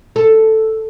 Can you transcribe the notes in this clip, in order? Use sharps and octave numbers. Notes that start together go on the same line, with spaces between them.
A4